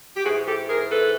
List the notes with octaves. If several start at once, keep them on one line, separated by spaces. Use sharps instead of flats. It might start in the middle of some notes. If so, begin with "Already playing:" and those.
G4
G#2 E3 F#4 G#4
G4 A4
G#4 A#4
A4 B4